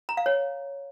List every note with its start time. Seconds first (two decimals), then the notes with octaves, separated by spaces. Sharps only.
0.09 A#5
0.17 F5
0.26 C#5